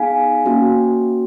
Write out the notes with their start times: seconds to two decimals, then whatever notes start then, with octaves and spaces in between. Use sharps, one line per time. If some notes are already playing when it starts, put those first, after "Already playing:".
Already playing: B3 D#4 G#4 F5 G#5
0.45 A#3 C#4 F#4